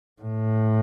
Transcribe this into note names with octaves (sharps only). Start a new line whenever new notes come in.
A2